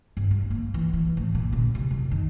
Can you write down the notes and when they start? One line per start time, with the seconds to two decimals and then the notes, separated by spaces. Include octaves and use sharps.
0.17 G2
0.31 D4
0.50 A#3
0.74 E3
0.94 E3
1.17 A2
1.35 A#2
1.53 C#3
1.75 C2
1.91 F#2
2.11 D#3